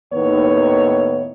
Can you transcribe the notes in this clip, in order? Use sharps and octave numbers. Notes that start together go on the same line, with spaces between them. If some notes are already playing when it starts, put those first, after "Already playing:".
D#2 A2 B3 D#4 C#5